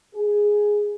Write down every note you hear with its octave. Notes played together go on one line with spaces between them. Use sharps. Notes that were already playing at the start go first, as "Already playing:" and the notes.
G#4